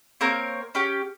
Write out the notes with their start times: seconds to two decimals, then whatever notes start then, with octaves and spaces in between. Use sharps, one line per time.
0.21 A#3 C4 A#4 C#5
0.75 C#4 G4